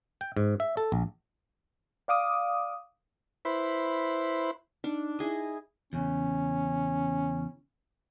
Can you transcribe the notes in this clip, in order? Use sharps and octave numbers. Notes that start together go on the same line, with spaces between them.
G5
G#2
E5
A4
A#1
D5 F5 D6 D#6
E4 B4 C5
D4 D#4
E4 G#4 D#5
E2 C#3 C#4